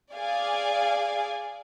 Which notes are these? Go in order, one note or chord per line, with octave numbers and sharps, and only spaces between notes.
G#4 D5 F5 G#5